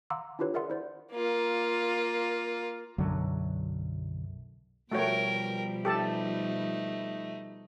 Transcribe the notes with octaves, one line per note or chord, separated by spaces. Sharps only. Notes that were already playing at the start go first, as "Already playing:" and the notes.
F5 F#5 A#5 C6 D6 E6
D4 E4 F4 G4 B4 C#5
G#4 A#4 D5 E5 F#5 C6
E4 C5 D5
A#3 F4
B1 F#2 D3 F#3
B2 F3 G3 A3 F#4 A#4 C#5 G5
A3 D#4 G4 A4 A5